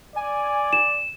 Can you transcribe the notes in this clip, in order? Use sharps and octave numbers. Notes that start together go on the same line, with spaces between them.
D5 G#5
E7